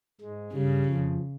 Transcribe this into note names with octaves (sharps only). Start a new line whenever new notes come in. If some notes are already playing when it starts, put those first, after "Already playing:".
G#2 G#3
G2 C#3 G3
F2 F3